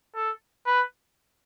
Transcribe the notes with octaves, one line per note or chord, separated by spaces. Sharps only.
A4
B4